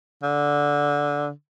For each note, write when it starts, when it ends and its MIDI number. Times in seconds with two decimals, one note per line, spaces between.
0.23 1.30 50